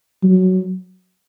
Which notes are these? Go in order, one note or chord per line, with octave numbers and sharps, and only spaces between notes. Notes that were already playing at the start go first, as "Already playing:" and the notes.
F#3